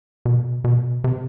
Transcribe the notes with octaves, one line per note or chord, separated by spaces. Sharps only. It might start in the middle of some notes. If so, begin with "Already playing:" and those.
B2
B2
C3